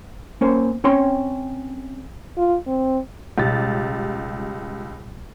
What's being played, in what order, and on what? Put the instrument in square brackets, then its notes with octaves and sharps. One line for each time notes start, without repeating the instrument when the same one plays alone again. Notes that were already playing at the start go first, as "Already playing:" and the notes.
[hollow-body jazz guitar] A#3 C#4 C5
C4 C#4 C#5 G5 C6
[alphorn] F4
C4
[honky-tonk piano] C#2 G4 A6 [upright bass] B2 G3